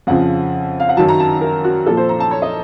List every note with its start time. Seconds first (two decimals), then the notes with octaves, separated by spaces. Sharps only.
0.07 F2 C#3 F3 F#5
0.80 F5
0.89 F#5
0.97 F#2 D#3 F#3 A5
1.09 A#5
1.20 A5
1.41 A#4
1.64 F#4
1.86 A#2 F3 A4
1.97 C5
2.09 A#5
2.20 A5
2.31 C#5
2.42 D#5